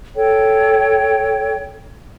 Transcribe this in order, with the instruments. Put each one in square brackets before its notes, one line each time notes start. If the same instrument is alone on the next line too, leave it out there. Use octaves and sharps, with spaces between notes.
[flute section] A4 C#5 G5